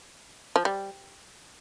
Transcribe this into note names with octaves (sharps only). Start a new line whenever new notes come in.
F3
G3